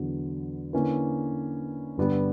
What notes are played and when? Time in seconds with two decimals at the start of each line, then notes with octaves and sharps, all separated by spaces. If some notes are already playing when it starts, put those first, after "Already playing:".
Already playing: E2 D3 F#3 B3
0.73 D3 A#3 C#4 E4 B4
1.97 G2 D3 G3 B3